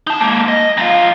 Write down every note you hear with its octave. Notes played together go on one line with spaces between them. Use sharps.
D#4 A5
G#3 A#3
D#5
F#2 F4